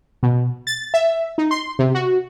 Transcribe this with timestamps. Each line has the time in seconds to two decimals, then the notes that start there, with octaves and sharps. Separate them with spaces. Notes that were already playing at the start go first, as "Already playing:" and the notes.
0.23 B2
0.67 A6
0.94 E5
1.38 D#4
1.51 C6
1.79 C3
1.95 F#4